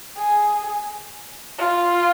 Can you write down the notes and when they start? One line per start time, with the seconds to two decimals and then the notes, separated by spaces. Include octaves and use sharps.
0.17 G#4
1.58 F4